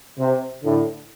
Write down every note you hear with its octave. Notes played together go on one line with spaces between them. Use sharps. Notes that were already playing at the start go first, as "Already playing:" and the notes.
C3
A2 D3